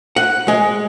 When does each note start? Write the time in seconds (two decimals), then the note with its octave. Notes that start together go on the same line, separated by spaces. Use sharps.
0.16 F#5
0.48 G#3